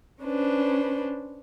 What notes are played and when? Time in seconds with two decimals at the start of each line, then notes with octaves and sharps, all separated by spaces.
0.22 C#4 D4 B4 C5